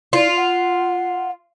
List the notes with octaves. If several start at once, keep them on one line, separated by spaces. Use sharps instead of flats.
E4 F4
F#5